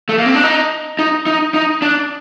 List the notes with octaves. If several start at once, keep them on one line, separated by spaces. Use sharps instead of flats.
A3
A#3
C4
D4
D#4
D#4
D#4
D#4
D4